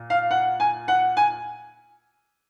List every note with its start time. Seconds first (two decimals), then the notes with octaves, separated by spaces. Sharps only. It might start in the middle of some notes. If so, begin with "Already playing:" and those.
Already playing: A#2
0.10 F5
0.31 F#5
0.60 G#5
0.88 F#5
1.17 G#5